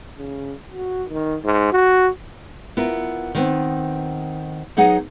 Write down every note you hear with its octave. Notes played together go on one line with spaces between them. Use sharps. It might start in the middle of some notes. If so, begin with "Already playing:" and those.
C#3
F#4
D#3
G#2
F#4
B3 E4 F4 A#4
D#3 B3 C4
F#3 B3 D#4 G#4 F#5